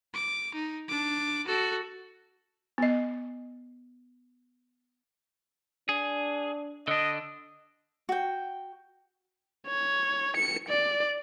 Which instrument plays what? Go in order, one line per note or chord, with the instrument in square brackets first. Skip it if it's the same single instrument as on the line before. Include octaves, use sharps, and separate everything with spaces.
[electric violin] D6
D#4
D4 D6
F#4 A4
[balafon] B3 D#5
[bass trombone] D4 [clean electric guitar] G#4
[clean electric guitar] D3 D4 [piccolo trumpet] D#5
[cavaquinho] F#4 G5
[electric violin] C#5
C#7
D5